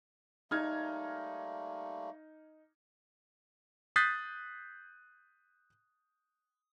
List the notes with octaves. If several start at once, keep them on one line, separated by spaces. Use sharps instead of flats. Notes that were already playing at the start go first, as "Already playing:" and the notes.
G3 A3 A#3 D#4 F6 G#6
D#6 F#6 G6 A6 B6 C7